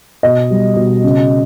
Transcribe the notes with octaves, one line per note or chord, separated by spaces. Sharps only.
B2 D#5
G3
B2
C#3